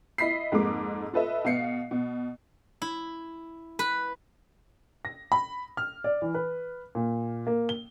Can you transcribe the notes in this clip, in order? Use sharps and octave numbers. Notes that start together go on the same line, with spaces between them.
E4 D#5 B5 B6 C7
F2 G#2 G#3 A#3 D6
F4 A4 B4 D#5 E5
B2 F5 C7 C#7
B2
E4
B4
A#6
B5
F6
D5
E3
B4
A#2
A#3
G7